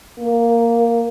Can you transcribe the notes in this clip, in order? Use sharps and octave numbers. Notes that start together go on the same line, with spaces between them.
A#3